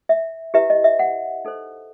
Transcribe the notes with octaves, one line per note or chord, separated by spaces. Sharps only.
E5
E4 G4 B4 E5
D#5
E5
F#5
D#4 A4 C5